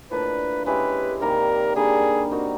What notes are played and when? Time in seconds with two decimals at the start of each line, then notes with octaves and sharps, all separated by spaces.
0.11 A2 F3 A#3 D4 B4
0.66 G#3 C#4 E4 G4 B4
1.21 C3 D#3 G3 A#3 A#4
1.76 D3 G3 A#3 G#4
2.31 C4 D#4 F#4 A#4